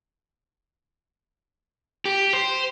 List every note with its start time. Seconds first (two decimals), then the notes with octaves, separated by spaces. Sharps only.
2.05 G4
2.33 C5